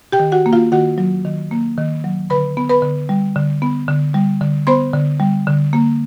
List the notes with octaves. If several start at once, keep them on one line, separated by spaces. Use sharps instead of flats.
G4 G5
D#3
F#4 F#5
A#3
F4 F5
D#3 F#4 F#5
F#3
D#3
A#3
D#3
F#3
D3 B4 B5
B3
B4 B5
D3
G3
D3
B3
D3
G3
D3
B3 C5 C6
D3
G3
D3
A#3